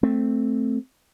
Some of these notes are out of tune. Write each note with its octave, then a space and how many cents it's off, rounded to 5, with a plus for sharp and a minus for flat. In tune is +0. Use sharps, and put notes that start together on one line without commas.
A3 +0 C4 +0